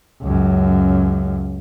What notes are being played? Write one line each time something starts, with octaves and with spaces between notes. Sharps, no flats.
C#2 F#2